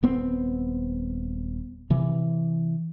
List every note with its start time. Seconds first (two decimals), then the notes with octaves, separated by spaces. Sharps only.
0.03 D#1 B3 C4
1.90 C3 E3